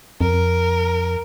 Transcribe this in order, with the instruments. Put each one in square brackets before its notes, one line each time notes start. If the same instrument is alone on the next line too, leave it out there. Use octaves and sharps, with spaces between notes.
[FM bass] F2 [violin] A#4